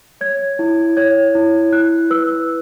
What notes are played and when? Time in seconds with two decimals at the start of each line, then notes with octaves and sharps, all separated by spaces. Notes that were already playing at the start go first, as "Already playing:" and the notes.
0.21 C#5 G#6
0.59 E4
0.97 C#5 G#6
1.35 E4
1.72 E4 F#6
2.10 B4 E6